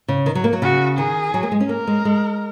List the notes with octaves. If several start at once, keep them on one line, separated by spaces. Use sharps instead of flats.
C#3
D#3
F#3
A#3
F#3
C#3 F#4
D#3 G#4
F#3
A#3
G#3
C#4
A#3 A#4
G#3
G#3